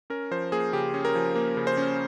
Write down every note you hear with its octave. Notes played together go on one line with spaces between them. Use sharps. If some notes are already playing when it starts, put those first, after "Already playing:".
C#4 A#4
F3 C5
A#3 G#4
C#3 G4
C#4
A#4
F3
A#3
C#3
C5
C#4